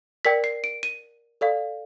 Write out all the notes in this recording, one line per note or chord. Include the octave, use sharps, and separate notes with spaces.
A#4 D5 G5 B6
C7
D7
D#7
A4 D5 F5